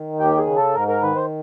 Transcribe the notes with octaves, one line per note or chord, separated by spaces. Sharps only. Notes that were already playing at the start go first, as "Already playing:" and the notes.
Already playing: D#3
D#2 G4
G#4
C#3
A4
G#2 A#4
A#4
D#3 B4
C5